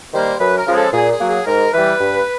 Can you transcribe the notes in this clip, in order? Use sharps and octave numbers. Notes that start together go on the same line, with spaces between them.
D#3 G3 A#3 C5
F#2 B4
A#4
C#3 F3 G#3
A4
A#2 G#4
G#4
F#3 A#3
G#4
G#2 A#4
E3 G3 B4
G2